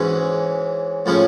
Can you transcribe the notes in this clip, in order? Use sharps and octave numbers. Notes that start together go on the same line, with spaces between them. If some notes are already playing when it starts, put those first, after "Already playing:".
Already playing: G#2 E3 G#3 C#4 F#4
A2 F3 G#3 C#4